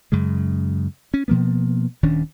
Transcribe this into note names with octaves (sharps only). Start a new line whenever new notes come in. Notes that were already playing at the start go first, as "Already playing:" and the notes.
F#2 C#3 G#3
C#4
B2 F3 A#3 B3
D#1 D#3 C#4 D4